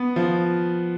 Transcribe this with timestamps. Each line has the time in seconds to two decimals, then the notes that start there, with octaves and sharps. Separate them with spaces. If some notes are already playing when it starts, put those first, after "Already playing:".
Already playing: B3
0.16 F3